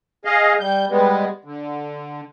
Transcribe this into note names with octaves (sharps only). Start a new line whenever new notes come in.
G#4 D#5 F5
G3 G6
G3 G#3 B3
D3